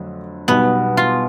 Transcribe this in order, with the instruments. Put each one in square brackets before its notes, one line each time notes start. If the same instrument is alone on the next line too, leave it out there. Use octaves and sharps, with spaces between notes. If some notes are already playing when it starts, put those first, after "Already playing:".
Already playing: [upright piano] F2 D3 F#3 A3
[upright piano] B1 B2 G3 [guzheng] B3
[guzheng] F4